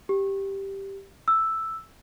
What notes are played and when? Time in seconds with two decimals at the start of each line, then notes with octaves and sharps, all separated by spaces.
0.09 G4
1.28 E6